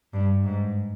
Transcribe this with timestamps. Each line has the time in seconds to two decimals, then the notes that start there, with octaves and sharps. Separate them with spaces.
0.13 G2
0.44 G#2